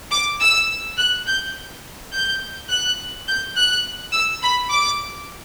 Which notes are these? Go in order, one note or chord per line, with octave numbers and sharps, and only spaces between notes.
D6
E6
F#6
G6
G6
F#6
G6
F#6
E6
B5
D6